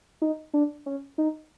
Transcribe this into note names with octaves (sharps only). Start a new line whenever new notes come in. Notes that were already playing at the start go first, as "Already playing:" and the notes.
D#4
D4
C#4
D#4